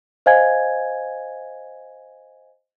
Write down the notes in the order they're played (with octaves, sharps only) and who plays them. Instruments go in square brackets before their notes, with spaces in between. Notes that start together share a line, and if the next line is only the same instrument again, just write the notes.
[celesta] C5 D#5 F5 G#5 G#6